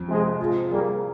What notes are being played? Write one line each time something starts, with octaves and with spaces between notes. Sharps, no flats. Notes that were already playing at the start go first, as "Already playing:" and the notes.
Already playing: F2
C3 F3 G#3
F3 G#3 F4
G3 A#3 G#4